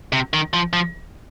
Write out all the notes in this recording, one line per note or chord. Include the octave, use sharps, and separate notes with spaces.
C3
D#3
F3
F3